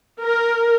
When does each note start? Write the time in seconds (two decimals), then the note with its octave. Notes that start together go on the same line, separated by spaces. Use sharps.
0.22 A#4